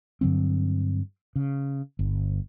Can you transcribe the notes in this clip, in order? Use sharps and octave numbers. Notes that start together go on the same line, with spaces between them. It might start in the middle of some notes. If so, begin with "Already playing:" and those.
G2 D3 F#3 C4
C#3
G1